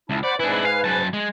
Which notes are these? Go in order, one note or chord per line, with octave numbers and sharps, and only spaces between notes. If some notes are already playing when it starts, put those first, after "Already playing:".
C#2 E4 A5
C5 D5 F#5 B5
G#2 D4 E4 B4 G#5
F5
F#2 A5
G#3